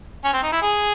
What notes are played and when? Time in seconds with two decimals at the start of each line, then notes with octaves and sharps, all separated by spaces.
0.24 C#4
0.33 C4
0.43 D#4
0.52 E4
0.62 G#4